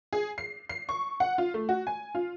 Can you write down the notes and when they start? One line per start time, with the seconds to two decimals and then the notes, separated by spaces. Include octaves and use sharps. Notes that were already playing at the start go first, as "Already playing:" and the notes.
0.13 G#4
0.38 C7
0.69 C7
0.89 C#6
1.20 F#5
1.38 F4
1.54 A3
1.69 F#4
1.87 G#5
2.15 F4